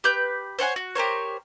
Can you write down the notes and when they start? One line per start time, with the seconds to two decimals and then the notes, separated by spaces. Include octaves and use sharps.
0.04 G4 B4 G6
0.58 C5 C#5 F#5 G#5
0.76 F#4
0.95 G4 A#4 C5 C#5